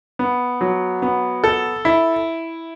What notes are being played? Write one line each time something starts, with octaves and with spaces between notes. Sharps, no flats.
B3
F#3
B3
A4
E4